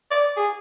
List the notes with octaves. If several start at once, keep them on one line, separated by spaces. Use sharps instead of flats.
D5
G#4